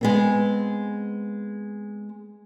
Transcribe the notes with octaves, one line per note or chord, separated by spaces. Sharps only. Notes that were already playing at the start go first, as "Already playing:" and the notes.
G#3 B3 C4